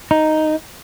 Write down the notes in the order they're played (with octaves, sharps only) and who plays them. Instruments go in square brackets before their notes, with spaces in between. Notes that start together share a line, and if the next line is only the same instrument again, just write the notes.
[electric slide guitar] D#4